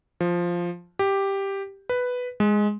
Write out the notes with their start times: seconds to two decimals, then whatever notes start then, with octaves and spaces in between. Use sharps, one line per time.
0.21 F3
0.99 G4
1.89 B4
2.40 G#3